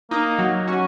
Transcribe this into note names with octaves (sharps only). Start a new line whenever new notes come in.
A#3 D#4
F#3
C#4 F#4